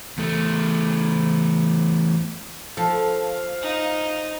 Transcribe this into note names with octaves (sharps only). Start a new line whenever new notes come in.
E2 A3
F3 A4 F5
D#4